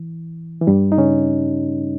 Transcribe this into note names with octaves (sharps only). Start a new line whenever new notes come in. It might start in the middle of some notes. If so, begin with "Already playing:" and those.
Already playing: E3
E3
G2 G3
D#4
C#3 C#4